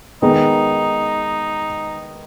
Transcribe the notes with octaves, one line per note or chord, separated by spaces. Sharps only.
D#3 G#3 B3 D#4